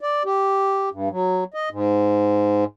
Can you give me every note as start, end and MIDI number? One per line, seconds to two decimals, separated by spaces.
0.01 0.23 74
0.25 0.89 67
0.92 1.09 43
1.10 1.44 54
1.54 1.69 75
1.71 2.64 44